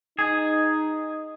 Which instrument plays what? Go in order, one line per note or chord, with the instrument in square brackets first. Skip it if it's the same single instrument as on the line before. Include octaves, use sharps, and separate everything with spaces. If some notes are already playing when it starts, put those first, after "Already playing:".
[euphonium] D#4 [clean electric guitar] G#4